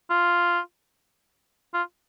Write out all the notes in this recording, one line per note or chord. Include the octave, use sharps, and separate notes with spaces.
F4
F4